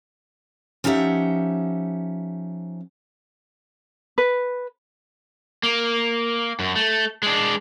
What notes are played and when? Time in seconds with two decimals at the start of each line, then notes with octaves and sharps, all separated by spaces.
0.84 F3 C#4 D#4 G4 E5 F#5
4.18 B4
5.63 A#3
6.59 F#2
6.76 A3
7.23 G#3 D4